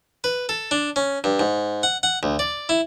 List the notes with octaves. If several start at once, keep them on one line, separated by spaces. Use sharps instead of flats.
B4
A4
D4
C#4
G2
G#2
F#5
F#5
D2
D5
E4